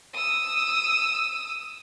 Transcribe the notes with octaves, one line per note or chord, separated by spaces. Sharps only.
D#6 E6